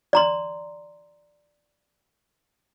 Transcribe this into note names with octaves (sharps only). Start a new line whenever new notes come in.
D5 A#5 C6